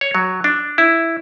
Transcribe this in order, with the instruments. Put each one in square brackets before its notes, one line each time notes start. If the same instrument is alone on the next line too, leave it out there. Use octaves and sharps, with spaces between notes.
[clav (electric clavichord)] C#5
F#3
D4
E4